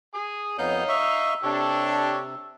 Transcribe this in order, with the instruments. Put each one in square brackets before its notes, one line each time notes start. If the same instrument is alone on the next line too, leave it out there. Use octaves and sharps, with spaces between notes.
[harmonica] G#4 D#6
[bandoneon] F2 B3 G6 [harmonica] D#4 D#5 F5 [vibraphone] C#5
[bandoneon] E5 C#6 [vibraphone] E6
[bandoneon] C3 [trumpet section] D4 [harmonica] G4 A4 C#5